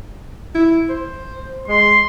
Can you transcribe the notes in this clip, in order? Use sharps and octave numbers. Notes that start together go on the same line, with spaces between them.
E4
C5
G#3 C6